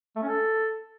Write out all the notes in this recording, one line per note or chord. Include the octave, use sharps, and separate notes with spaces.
A3
C#4
A4